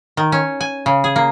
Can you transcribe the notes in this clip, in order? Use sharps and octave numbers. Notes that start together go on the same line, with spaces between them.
D#3
C#4
G#5
C#3
G#4
A#3